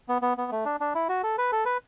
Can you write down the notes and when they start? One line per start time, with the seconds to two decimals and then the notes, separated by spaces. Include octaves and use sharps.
0.08 B3
0.22 B3
0.37 B3
0.51 A3
0.65 D4
0.80 D4
0.95 E4
1.09 F#4
1.23 A4
1.38 B4
1.52 A4
1.65 B4